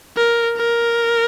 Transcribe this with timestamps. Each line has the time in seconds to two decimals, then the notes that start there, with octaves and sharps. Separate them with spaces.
0.16 A#4
0.57 A#4